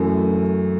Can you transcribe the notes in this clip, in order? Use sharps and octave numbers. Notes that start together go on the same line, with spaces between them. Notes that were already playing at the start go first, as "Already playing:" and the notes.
Already playing: F#2 E3 A3